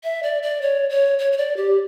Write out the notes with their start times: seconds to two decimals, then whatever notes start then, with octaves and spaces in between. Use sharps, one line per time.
0.04 E5
0.23 D5
0.43 D5
0.61 C#5
0.90 C#5
1.19 C#5
1.32 C#5
1.38 D5
1.57 G4